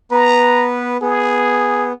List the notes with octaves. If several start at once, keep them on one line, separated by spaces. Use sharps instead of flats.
B3 B4 A#5
B3 G#4